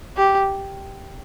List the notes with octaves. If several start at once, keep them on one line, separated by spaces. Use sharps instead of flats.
G4